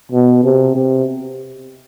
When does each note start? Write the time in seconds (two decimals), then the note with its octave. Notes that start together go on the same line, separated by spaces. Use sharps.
0.12 B2
0.44 C3
0.75 C3